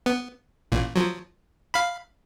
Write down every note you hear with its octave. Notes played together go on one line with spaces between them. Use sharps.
B3
A1 A#2
F3 F#3
F5 B5